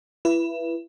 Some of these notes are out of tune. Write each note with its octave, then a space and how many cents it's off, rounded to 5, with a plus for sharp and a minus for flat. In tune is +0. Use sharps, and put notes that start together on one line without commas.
E4 +25 B4 -10